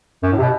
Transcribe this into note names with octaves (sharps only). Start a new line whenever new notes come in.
F#2
A2
C3
B2